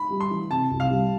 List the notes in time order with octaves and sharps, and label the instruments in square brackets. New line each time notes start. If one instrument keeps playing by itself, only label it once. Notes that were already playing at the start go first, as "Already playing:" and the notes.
Already playing: [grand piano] B5
[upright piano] G3
[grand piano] C6
[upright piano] E3
[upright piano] C3 [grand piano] A5
[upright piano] C2
[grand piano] F5
[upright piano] G3